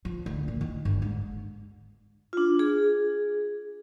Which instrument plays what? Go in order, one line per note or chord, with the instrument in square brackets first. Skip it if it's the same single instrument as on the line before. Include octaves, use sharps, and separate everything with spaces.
[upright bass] F3
D2
A#2
D#3
G1
G#2
[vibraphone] D4 F4
G#4